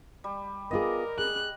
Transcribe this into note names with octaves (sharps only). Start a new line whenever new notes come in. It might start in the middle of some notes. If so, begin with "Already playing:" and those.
G3
B3 F4 G#4 A#4 D#5 D6
G#4 F#6